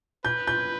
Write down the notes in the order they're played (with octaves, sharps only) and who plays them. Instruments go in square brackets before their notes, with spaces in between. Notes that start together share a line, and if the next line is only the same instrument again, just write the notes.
[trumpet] B4 [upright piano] G6
[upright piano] G6